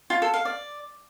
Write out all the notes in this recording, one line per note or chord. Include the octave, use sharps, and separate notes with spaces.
F4
A4
F5
D5